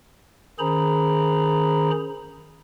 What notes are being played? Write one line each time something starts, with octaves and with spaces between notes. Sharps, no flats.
D#3 C#4 G#4 C5 A#5 B5